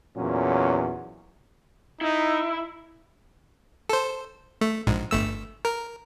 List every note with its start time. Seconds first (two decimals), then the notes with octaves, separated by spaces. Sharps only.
0.17 E2 A#2 F#3 C#4
2.01 D#4 E4
3.89 A4 C5
4.61 A3
4.87 A#1 G#2
5.11 G1 A3 E6
5.65 A#4